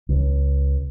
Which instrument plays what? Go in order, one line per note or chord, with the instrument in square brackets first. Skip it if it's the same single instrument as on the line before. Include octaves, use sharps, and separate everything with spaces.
[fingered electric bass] C#2